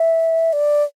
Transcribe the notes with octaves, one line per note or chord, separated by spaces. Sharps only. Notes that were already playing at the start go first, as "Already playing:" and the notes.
Already playing: E5
D5